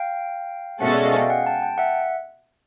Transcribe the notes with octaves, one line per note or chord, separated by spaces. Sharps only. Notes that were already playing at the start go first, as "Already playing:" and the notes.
Already playing: F5 G5
B2 G#3 C#4 F#4 A4 E5 F#5
D5 E5
D#5 F5
F5 G5
F#5 G#5
G5 A5
G5 A5
E5 F#5